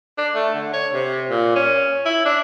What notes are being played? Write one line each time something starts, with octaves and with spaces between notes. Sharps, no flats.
D4
A3
D3
C#5
C3
A#2
C#4
E4
D4